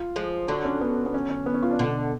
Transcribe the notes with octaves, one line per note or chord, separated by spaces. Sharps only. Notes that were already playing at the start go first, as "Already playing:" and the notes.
Already playing: F4
F3 G#3
D3 F#3 D4
C#4
B3
B3
C#4
C#4
B3
C#4
F4
D4
B2 D3